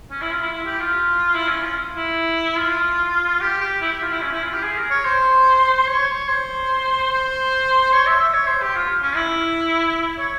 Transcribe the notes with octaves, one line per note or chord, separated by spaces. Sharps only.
C#4
E4
F4
E4
E4
G4
F4
E4
C#4
F4
E4
F4
G4
G4
E4
G4
F4
E4
C#4
E4
F4
G4
G#4
A#4
C#5
C5
C#5
C5
C5
C#5
E5
E5
C#5
C5
G4
F4
C#4
E4
C#5